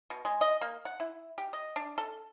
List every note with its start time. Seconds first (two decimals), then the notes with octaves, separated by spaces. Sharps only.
0.10 B2
0.25 G#3
0.41 D#5
0.61 A#3
0.85 F#5
1.00 E4
1.38 G4
1.53 D#5
1.76 D4
1.98 A4